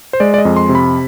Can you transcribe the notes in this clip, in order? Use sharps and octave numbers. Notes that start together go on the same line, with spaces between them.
C5
G#3 D5
D5
D#5
F2
C6
C3
B5